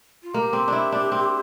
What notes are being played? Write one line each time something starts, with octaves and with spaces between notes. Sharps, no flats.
F4
A#3 G4
C4
D4 E4
D4
C4